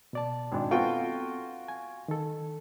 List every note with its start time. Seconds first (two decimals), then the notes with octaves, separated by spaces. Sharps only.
0.13 B2 D5 A5
0.52 G#1 D4
0.71 B3 C4 F4 F#4 A4 G5
1.68 G#5
2.08 D#3 A4